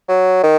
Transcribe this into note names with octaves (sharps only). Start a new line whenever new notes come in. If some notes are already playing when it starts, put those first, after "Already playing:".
F#3
D#3